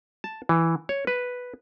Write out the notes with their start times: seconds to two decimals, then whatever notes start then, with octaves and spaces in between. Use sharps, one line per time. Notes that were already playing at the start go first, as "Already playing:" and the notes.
0.24 A5
0.49 E3
0.89 C#5
1.07 B4